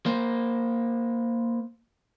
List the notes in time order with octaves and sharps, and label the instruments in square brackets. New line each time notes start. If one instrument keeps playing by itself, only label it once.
[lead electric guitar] A#3 C5